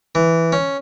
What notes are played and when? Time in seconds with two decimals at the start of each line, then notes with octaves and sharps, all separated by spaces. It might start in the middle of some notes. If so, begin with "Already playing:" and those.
0.15 E3
0.52 C#4